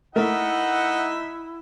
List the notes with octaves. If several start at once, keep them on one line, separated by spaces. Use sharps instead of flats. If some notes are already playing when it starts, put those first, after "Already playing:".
A3 D#4 E4 A#4 E5 F#5